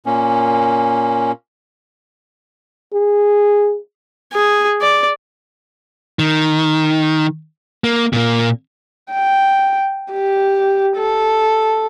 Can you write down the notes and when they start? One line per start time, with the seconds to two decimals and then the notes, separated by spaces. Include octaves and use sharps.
0.06 A#2 A#3 C#4
2.93 G#4
4.33 G#4
4.82 D5
6.19 D#3
7.84 A#3
8.13 A#2 A#3
9.13 G5
10.13 G4
10.97 A4